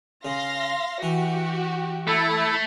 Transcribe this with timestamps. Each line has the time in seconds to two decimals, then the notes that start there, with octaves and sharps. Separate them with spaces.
0.25 C#3 F5 C6 A#6
1.03 E3 F#4 G4
2.07 A3 E4 A4